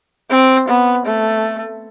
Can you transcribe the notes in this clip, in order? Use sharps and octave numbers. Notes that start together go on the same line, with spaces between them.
C4
B3
A3